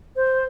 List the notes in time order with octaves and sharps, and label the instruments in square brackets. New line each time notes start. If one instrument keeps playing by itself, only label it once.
[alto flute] C5